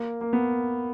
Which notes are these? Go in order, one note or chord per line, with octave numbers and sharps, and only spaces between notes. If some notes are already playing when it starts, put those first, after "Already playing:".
Already playing: A#3
A#3
B3